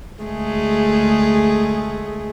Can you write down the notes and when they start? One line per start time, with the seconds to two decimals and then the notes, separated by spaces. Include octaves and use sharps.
0.23 D2 G#3 A3 G#4